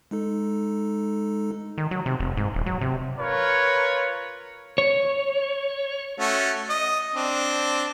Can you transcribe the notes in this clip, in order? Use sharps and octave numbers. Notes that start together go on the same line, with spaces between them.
G#3 D#4 A4
D#3
F#3
C3
F1
G#2
D#1
F#3
C3
F4 A#4 B4 C#5
C#5
A3 C#4 F#4
D#5
C4 D4